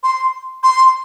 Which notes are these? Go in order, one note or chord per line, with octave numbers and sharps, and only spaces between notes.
C6
C6